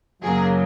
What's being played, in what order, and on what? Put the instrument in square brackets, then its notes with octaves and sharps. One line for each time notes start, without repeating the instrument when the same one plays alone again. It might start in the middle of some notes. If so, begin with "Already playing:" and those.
[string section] F#2 C#3 F#3 A#3 G#4